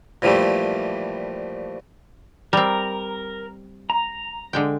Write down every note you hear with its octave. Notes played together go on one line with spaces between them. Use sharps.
A#2 E3 F3 G3 A3
G3 C4 A#4
A#5
D3 G#3 G5